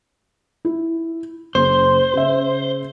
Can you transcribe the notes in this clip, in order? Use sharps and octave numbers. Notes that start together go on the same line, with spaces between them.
E4
F#1 C5
C#3 E5